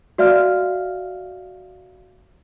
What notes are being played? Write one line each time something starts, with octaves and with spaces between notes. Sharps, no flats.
F#4 D5 E5 F5 F6